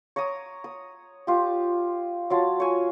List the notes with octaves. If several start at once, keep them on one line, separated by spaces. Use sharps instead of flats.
C#5 A#5 D6 D#6
D#6
F4 G4
F#3 F4 C#5 A5
C#5 G#5